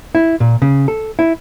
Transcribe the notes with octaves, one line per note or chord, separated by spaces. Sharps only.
E4
A#2
C#3
A4
E4